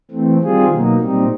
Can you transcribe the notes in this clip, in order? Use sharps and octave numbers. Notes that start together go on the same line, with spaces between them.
E3 A3 C4
D#3 G3 C4 F4 G#4
B2 F#3 A#3 D#4
A#2 G3 C4 D#4